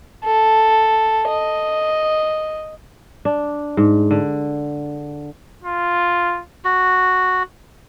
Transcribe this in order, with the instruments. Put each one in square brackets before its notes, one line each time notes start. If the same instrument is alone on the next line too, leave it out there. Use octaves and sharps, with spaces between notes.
[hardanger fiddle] A4
D#5
[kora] D4
G#2
D3
[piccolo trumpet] F4
[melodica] F#4